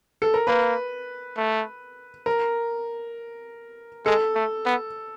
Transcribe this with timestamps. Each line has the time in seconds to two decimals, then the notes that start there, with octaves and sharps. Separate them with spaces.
0.22 A4
0.34 A#4
0.47 A#3 B4
1.37 A3
2.26 A#4
4.05 G#3 A4
4.35 A3
4.66 B3